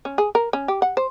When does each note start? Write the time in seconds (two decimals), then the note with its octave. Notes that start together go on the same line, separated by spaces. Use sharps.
0.05 C#4
0.18 G#4
0.35 A#4
0.53 C#4
0.68 G4
0.82 F#5
0.97 C5